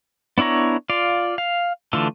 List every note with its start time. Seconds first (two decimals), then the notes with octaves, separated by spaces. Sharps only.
0.38 B3 D4 E4 C#5 A#5
0.90 F4 D5 F5
1.38 F5
1.93 D3 E3 A3 F4 A4